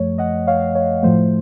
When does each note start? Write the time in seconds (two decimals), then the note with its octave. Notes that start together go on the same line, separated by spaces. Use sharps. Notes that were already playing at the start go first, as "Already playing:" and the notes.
Already playing: F#2 F3 A3 C#5
0.18 D#5 F#5
0.47 C#5 F5
0.75 C#5
1.03 A2 F3 A3 C5